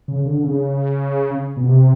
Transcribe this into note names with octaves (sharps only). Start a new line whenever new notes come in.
C#3
D3
C#3
B2
C3